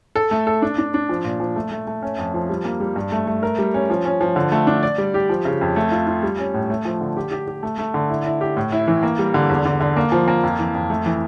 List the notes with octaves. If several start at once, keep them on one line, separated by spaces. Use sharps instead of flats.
A4
A3
A4
D4
D4
D4
F3
A#2
F3
A3
A3
A3
C#4
F2
F3
G3
A#3
G3
G2
A3
A3
A#4
G3
C#4
F3
C#4
F3
D3
A3
D4
D5
G3
G4
F3
C#3
F2
A3
F4
F4
G3
C#4
A2
A3
F3
D3
G4
G4
G4
A3
A3
D3
E4
E4
G4
A2
E4
E3
A#3
G3
D3
E2
D3
D3
A#3
F3
A#3
F2
E3
F2
A3
E3